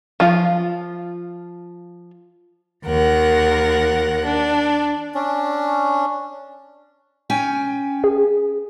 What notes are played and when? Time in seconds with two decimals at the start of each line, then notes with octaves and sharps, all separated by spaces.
0.20 F3 F4
2.86 D#2 A#4 F#5
4.25 D4
5.15 C#4 D4
7.30 C#4 G5 G#5
8.04 G#4